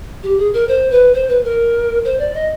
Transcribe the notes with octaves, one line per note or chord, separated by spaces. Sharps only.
G4
G#4
A#4
C5
B4
C5
B4
A#4
C5
D5
D#5